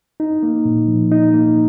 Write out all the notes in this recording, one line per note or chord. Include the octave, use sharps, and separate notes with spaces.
D#4
A#3
A#2
F3
D#4
A#3